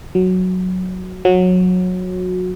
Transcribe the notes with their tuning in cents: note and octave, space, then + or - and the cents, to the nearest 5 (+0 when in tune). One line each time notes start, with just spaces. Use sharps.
F#3 -5
F#3 -20